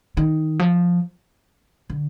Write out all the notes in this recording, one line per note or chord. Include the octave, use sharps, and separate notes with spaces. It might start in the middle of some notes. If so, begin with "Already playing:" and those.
D#3
F3
D3